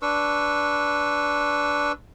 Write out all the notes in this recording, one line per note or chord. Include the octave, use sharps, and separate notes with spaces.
D4 B4 C#6 E6